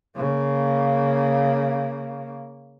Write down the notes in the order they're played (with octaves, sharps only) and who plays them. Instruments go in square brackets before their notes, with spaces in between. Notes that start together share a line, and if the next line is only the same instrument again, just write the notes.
[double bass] C#3 A#3